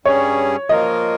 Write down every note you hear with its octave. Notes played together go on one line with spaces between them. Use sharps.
G2 G3 C#4 G#4 C#5
F3 A#3 F4 A#4 D#5